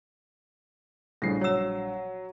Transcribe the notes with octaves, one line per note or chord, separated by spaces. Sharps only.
A#1 A2 C#3 G3 A#6 C7
F#3 C#5 E6 E7